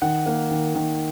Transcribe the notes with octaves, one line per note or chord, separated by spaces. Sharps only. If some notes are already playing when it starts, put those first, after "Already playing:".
D#3 F#5
A#3
D#3
D#3